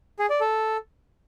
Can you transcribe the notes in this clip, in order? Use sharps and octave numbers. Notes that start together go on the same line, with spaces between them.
G#4
D5
A4